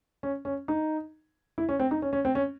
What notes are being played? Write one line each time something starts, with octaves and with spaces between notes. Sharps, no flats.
C#4
C#4
D#4
E4
C#4
C4
D#4
C#4
C#4
C4
C#4